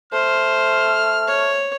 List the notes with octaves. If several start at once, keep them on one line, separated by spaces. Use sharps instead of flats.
A3 C5 F6
C#5